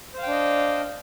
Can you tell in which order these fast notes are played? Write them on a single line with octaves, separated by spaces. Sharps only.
C5 F5 G5 D4 D#5